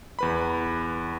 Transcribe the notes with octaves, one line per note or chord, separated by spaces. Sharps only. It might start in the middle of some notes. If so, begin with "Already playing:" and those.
E2 B4 B5